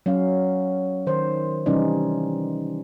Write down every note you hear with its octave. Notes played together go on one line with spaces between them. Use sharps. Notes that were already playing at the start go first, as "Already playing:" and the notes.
F#3 C#4 F5
D#3 C5
C3 E3 G3 C#4 D#4 D5